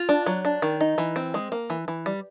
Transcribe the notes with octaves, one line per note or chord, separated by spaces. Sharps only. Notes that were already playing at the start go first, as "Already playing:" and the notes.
Already playing: F4
D4
F#3
D4
D#3
D#4
E3
C4
G#3
A#3
E3
E3
G3